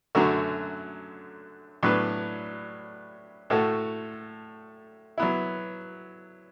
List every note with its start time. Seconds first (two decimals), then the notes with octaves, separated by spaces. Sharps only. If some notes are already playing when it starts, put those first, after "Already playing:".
0.15 F#2 D3 F#3 A3 F#4
1.83 A2 F#3 B3 D4 B4
3.50 A2 A3 F#4 A4
5.18 F#3 B3 E4